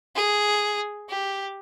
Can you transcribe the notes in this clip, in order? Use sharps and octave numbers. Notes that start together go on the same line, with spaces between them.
G#4
G4